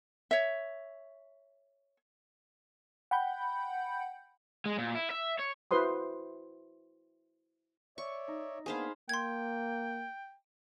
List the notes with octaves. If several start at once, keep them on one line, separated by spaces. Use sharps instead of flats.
C#5 E5
F#5 G5 B5 G6
G#3
A#2
E4
E5
C#5
E4 F#4 B4 C5 C6 D#6
C#5 D5 E5 C#6
D#4
A#3 B3 D4 G#4 C5 F5 G#5 B5
A#3 G5 C6 G#6